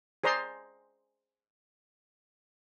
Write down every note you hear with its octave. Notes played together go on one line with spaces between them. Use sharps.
G#4 C5 D5 A#5 C6